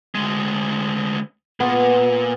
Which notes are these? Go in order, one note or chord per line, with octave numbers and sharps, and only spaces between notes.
D2 G#3
A#2 B3